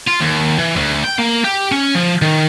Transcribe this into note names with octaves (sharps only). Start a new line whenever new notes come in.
F4
D#2
E3
D2
G5
A#3
G4
C#4
F3
D#3